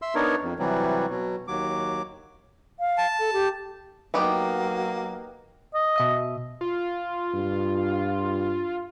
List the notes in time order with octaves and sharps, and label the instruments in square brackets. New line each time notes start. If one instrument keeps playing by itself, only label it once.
[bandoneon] E5 C6 E6
B3 D4 D#4 A#4 C#5
F2
C3 E3 F#3 G3
B2 F#3
D#2 F#3 D6
[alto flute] F5
[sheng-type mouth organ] A5
[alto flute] A4
G4
[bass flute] F#3 [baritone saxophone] A#3 [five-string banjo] B3 D#4 G4
[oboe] D#5
[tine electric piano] B2 E5 D#6
[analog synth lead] F4
[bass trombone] G2